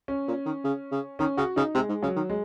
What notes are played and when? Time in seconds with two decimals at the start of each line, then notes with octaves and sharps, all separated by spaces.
0.08 C#4
0.28 A#2
0.46 D#3
0.64 C#3
0.92 C#3
1.19 D#3 C#4
1.37 C#3 F#4
1.56 C#3 D#4
1.75 C3 G#3
1.89 G#2
2.03 C#3 F#3
2.16 D#3
2.29 G#3